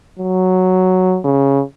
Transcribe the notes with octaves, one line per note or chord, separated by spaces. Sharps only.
F#3
C#3